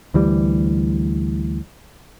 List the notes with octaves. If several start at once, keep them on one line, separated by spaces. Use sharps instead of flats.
D2 E3 G3